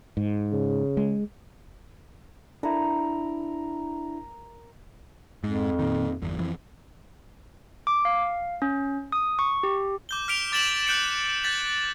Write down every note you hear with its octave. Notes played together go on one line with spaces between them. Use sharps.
G#2
C#3
G#3
D4 E4 A#4
F2 G#2
A#2 D#3
G1 E2
F2 E3
D6
F5
C#4
D#6
C#6
G4
D6 G6 G7
F6 B6 D7 F7
D6 A6 B6 E7 F#7
F#6 G6 C#7 D7
G6 A6 B6 F#7